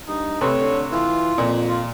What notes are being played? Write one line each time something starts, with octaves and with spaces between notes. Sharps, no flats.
G2 D#4
C3 A3 B4 C#5
D3
E3 F4
F2 A#2
F4